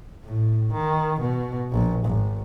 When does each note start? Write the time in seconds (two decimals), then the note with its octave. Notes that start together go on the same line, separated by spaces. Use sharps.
0.25 A2
0.73 D#3
1.20 B2
1.72 A#1
2.06 G#1